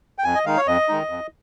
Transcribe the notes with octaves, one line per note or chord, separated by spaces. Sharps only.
G5
F2 G#5
D#5
D#3 G#3 D#4 F5
C#5
F2 D#5
D#3 G#3 D#4
F2